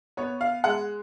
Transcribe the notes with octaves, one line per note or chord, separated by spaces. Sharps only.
B3 C#5
F5
G#3 F#5